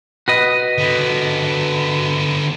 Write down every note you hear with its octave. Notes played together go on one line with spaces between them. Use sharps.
F#4 B4 D#5
D3 B3